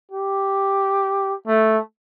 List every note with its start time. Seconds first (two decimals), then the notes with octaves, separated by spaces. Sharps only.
0.11 G4
1.47 A3